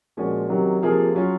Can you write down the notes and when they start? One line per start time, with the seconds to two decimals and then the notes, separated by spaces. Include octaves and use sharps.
0.17 A#2 F3 G#3 C#4 F#4
0.49 C3 D#3 F#3 C#4
0.82 C3 F3 A#3 F4 G#4
1.15 F#3 C#4 F4